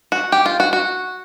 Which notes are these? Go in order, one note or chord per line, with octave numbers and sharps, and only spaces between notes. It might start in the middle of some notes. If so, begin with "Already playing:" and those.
F#4
G4
F4
F#4
F#4